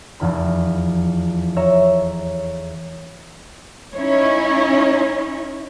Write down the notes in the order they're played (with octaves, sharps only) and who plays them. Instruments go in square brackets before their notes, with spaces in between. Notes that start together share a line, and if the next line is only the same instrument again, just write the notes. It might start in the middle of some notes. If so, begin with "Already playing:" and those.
[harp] F1 E2 B5
C#5 E5 A#5
[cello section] C#4 D#4 E4 C#5